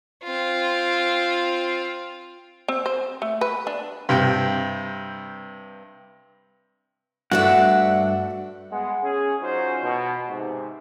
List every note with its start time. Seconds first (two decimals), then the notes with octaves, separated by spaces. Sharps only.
0.24 C4 F4
2.68 C4
2.86 C5
3.22 A3
3.41 B4
3.67 D4
4.09 G2 C3 G5
7.31 G2 A3 D4 F#4 E5 F#5
8.71 G#3 B3 F#5
9.03 C#4 G#4
9.40 F#3 C#4 D#4 F4 F#4 C5
9.81 B2
10.27 G#2 C3